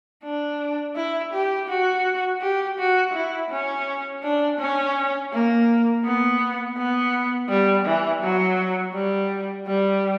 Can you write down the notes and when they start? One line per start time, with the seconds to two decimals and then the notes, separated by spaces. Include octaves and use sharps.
0.24 D4
0.96 E4
1.33 G4
1.69 F#4
2.41 G4
2.79 F#4
3.14 E4
3.51 C#4
4.23 D4
4.59 C#4
5.32 A#3
6.05 B3
6.77 B3
7.49 G3
7.86 E3
8.22 F#3
8.95 G3
9.67 G3